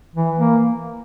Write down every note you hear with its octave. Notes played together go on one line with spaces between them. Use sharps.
E3
A#3